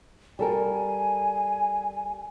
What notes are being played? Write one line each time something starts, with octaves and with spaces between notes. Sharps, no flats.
G3 A4 A#4 G#5